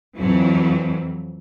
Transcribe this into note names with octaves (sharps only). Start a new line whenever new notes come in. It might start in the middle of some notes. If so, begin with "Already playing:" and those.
F2 E3 F#3